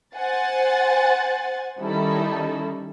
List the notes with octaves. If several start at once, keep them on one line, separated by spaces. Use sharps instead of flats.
C5 F#5 G#5 A6
D#3 G3 C#4 D#4 E4 A4